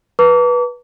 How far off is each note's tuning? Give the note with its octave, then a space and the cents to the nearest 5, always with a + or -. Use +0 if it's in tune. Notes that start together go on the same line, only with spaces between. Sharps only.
B4 -15 A#5 -45 D6 -40